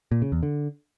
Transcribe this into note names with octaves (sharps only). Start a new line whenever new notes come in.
A#2
C#3
E2
D3